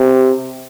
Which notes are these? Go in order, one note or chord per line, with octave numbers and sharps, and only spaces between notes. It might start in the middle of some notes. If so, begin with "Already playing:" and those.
Already playing: C3